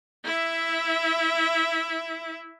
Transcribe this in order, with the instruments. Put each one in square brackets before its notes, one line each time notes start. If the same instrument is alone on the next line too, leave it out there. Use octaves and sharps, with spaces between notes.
[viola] E4 E5